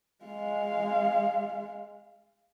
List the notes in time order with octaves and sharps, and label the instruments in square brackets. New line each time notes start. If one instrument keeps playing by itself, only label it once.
[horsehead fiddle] G#3 F5